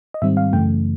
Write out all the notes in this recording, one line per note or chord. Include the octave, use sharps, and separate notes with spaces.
D#5
G#2 D#3 G3 C4 E5
F5
F#2 C#3 E3 A3 G5